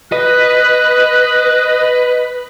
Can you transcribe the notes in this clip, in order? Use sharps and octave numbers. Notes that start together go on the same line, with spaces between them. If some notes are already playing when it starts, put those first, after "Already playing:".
B4 D#5 F#6